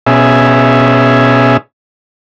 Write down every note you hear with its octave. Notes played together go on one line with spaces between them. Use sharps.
B2 C#4 G#4 E5